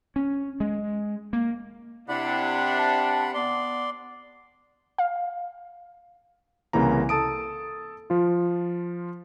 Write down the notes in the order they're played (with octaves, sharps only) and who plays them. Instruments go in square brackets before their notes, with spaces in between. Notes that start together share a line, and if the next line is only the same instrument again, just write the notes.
[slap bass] C#4
G#3
A#3
[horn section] C3 D4 [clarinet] E4 [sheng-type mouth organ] F#5 B5
[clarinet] A5
[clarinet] B3 [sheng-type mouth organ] D5 C6
[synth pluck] F5
[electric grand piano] C2 C#3 E3 A#3 A#5
A4 A5 D#6 D7
F3 F4